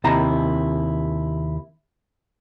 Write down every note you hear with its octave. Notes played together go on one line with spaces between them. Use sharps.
D#2 C3 E4 A5 A#5